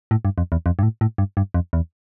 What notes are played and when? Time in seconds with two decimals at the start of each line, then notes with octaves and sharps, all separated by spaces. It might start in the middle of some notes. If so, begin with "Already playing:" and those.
0.11 A2
0.25 G2
0.38 F2
0.52 E2
0.66 F2
0.79 G2
0.83 A2
1.01 A2
1.18 G2
1.37 G2
1.54 F2
1.73 E2